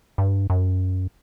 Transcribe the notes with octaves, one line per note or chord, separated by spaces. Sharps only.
G2
F#2